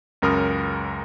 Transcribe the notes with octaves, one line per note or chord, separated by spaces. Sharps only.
C#2 F#2 A#4 B5 D#6 F6